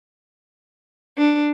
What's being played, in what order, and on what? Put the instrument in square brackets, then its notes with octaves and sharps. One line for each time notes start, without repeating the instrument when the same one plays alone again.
[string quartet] D4